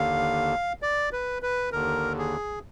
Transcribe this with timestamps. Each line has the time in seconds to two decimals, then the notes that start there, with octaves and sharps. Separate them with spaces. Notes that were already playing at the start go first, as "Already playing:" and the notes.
Already playing: D#2 D3 F5
0.82 D5
1.12 B4
1.42 B4
1.72 D#2 D3 A#4
2.19 G#4